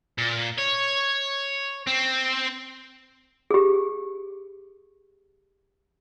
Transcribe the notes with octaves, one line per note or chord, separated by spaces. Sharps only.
A#2
C#5
C4
G4 G#4